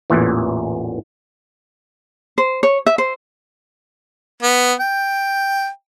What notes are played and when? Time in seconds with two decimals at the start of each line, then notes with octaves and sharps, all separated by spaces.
0.10 A1 E2 A#2 E3
2.38 C5
2.63 C#5
2.86 E5
2.98 C5
4.42 B3
4.80 G5